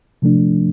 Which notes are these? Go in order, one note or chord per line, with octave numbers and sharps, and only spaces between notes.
C3 F3 A3 D4